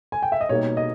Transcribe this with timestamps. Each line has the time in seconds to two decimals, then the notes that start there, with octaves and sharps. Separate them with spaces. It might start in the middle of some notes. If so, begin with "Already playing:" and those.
0.12 G#5
0.23 G5
0.32 E5
0.41 D#5
0.49 B2 G3 A#3 D#4 C#5
0.77 D#5